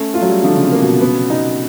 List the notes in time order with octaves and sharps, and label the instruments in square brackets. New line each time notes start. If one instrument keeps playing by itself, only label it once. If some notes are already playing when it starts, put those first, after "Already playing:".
Already playing: [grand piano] A3 [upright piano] C#4
[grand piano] A3 [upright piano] F4
[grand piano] F#3
G3
[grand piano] D3 [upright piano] F3
[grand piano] C#3
C3
[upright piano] A#3
[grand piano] B2
[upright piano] B3
D#4